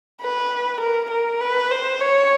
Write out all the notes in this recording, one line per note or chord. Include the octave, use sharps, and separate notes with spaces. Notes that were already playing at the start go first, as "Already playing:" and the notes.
B4
A#4
A#4
B4
C5
C#5